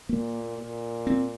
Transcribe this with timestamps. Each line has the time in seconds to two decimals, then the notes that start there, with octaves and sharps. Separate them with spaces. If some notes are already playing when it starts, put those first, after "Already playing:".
0.09 A#2 A#3
0.57 A#2
1.07 C4